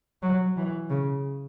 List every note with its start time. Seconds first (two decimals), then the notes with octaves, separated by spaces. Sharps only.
0.22 F#3
0.57 E3
0.90 C#3